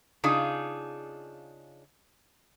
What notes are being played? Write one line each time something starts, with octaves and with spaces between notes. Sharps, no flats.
C#3 D4 D#4 F4 G#4